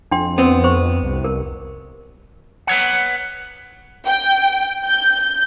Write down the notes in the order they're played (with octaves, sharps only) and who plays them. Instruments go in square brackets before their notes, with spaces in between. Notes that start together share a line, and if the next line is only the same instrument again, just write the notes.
[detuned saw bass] F2 [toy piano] D4 G5 C6
[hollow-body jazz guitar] B3 C4
[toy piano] C5 C#6
[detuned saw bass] C2
[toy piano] A#4
[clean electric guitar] B4 C#5 F#5
[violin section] G5
G6